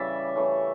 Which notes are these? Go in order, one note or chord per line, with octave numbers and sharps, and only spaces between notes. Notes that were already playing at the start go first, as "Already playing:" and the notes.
Already playing: C#3 E3 G3 D5 E5
C#3 E3 A3